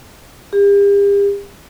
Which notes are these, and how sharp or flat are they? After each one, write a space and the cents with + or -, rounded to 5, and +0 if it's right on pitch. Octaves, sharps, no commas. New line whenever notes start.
G4 +40